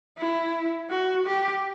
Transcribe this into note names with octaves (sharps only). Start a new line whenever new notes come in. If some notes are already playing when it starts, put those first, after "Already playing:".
E4
F#4
G4